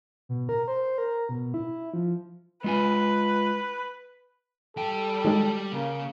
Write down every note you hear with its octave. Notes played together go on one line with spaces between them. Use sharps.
B2
A#4
C5
A#4
B2
E4
F3
G#3 F4 B4 G#5
G3 A4 G5
D#3 F#3 G#3
C#3 A#3